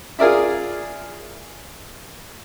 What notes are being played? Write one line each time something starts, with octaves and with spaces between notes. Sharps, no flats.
F4 G#4 A#4 D5 E5